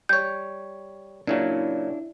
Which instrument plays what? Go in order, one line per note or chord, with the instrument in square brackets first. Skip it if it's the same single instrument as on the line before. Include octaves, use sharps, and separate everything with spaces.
[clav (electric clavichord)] G3 C#5 [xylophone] G6
[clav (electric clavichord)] A#2 C#3 F#3 [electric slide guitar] D4 E4